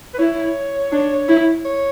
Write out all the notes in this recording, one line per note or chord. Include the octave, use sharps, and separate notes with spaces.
B4
E4 C#5
D4
E4
C#5